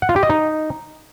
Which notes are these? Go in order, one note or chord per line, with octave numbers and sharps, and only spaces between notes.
F#5
F4
G4
D#5
D#4